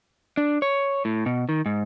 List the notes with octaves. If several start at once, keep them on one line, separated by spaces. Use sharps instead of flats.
D4
C#5
A2
B2
D#3
G#2